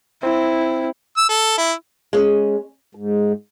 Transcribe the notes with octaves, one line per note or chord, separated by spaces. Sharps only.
C4 E4
E6
A4
E4
G#3 C#4
G#2